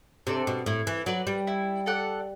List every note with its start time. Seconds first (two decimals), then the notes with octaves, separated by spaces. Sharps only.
0.27 C3 D4 A4 D5
0.47 B2
0.66 A2 E4
0.87 E3
1.06 F#3 B4 D5
1.27 G3
1.47 E4
1.86 A4 D5 F#5